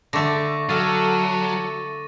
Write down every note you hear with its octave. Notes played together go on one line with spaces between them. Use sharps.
D3 A3 C#6 D6 A#6
F#3 A4 F5 A6 D#7